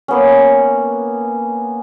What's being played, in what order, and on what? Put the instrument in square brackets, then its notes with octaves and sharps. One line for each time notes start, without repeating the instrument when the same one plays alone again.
[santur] A#3 B3 C#4